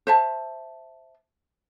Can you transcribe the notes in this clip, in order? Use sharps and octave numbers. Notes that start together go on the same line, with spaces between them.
C5 E5 A5